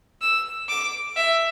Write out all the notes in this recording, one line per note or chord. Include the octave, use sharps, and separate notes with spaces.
E6
D6
E5